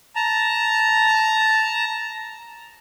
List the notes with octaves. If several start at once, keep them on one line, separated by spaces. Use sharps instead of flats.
A5 A#5